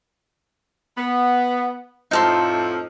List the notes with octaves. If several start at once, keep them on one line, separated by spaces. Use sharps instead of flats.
B3
F2 A2 F3 D#4 A4 C6